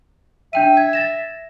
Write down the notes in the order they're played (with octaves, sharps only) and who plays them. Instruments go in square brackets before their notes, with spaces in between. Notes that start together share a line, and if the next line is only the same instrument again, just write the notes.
[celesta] D4 G5 D#7 [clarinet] E5
[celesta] G#6
A6 A#6 E7